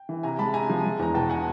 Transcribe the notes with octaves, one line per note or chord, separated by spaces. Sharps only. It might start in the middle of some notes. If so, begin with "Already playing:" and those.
Already playing: G5
E3
C3 G#5 A#5
G#3 A5 B5
C3 G#5 A#5
F3
G#3
E2 A#5
B2 G5 A5
B2 F#5 G#5